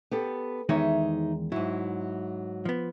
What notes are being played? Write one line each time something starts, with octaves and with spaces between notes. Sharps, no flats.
B3 G4 A4
E2 D#3 G#3 D#4 C#5 E5
G#2 F#3 E4
F3 B3